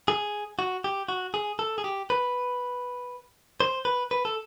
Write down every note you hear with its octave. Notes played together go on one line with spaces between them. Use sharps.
G#4
F#4
G4
F#4
G#4
A4
G#4
G4
B4
C5
B4
B4
A4